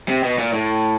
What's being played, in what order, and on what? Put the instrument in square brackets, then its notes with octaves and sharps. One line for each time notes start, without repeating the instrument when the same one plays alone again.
[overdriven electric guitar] C3
B2
A#2
A2